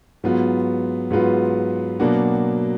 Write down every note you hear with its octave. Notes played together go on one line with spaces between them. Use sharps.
G#2 F#3 B3 F4 B4
G#2 F#3 B3 F4 B4
B2 F#3 A#3 D4 F#4